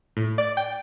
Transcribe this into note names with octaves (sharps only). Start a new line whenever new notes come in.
A2
D5
G5